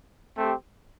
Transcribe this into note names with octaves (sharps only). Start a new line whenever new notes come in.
A3 C4 G4